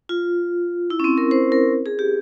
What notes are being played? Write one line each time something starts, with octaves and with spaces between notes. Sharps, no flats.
F4
E4
C#4
C4
A#4
C5
A#4
G#4
G4